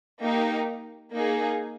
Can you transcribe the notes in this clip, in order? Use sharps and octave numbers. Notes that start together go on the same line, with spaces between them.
A#3 D#4 G4
A#3 D#4 G#4